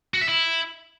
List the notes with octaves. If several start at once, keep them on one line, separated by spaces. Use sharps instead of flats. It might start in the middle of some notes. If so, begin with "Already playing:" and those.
F#4
E5
E4